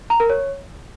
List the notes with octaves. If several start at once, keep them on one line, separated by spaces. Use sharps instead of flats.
A#5
A#4
C#5